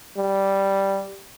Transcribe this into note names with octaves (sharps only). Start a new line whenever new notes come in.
G3